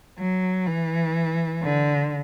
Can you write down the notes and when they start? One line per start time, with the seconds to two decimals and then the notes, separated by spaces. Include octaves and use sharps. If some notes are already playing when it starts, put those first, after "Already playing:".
0.18 F#3
0.67 E3
1.63 D3